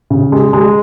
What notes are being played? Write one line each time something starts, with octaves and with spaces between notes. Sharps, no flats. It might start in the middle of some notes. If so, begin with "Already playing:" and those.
C#3
G#3
G#3